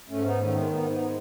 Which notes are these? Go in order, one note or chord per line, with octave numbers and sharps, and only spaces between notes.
G#2 A3 C#4
B3 D#4
D#3 A3 C#4
G#3 B3
G#2 B3 D#4
B3 D#4
G#3